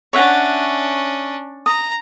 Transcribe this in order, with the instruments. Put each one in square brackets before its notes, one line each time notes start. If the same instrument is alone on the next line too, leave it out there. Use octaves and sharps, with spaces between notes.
[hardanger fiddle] C#4 D4 [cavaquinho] C#5 E5 F#5
[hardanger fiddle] A#5 [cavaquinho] D#6